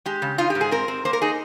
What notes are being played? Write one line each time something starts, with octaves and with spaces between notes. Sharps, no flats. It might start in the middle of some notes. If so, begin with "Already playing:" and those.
G#3 G4
C#3
D#4 F4
G4
G#2
G#4
C4 A#4
C4
A#3 C5
A#4
D#4 G#4